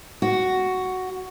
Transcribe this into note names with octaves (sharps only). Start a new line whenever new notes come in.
F#4